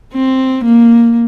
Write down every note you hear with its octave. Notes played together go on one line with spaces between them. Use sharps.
C4
A#3